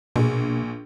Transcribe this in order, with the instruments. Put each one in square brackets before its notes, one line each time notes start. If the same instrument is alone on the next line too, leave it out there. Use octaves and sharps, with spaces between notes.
[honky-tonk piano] A#1 G#4 [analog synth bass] B2